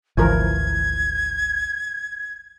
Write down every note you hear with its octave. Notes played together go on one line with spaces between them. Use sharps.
G#1 D2 E3 F3 A#4 G#6